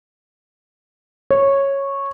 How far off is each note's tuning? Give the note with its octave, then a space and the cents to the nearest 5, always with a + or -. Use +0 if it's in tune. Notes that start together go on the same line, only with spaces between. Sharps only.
C#5 -10